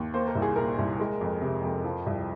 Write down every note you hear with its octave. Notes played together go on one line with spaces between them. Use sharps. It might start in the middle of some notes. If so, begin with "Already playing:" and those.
Already playing: D#2
A#3 C5
A#4
C2
G#4
A#2 A#4
C2
G#3
F2
C3
F2
F3
C2